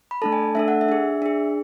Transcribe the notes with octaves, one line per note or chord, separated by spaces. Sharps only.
B5
A3 D4 A4 A5
G#5
A3 D4 A4 E5
F#5
E5
D4 G#4
D4 G#4